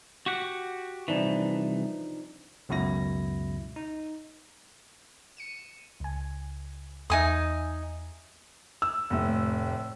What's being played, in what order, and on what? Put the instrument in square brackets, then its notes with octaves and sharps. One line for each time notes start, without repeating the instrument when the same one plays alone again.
[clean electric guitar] F#4 G4 F#5
[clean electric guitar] C2 F2 E3 [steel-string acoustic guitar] F3 D4 D#4
[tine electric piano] C#2 F#2 B2 E4 A#6
D#4
[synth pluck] C#7 D#7 E7
C#2 G#5
[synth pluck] E2 E5 [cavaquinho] D#4 G#5 D#6
[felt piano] E6
[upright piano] F1 A2